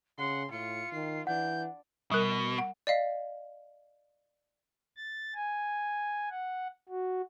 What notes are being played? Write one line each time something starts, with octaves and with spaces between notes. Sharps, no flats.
C#3 F#5 C6
A2 F4 C#7
D#3 C7
E3 D4 F#5 G6
B2 G3 A#4
F#5
D5 D#5 F5 B6
A6
G#5
F#5
F#4